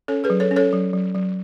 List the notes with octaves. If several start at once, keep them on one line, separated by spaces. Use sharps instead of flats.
C#4 A4 C#5
G#4 B4
F#3
A4 C#5
C#4
A4 C#5
F#3
F#3
F#3